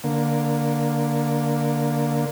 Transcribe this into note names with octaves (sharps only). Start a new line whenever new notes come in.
D3 A#3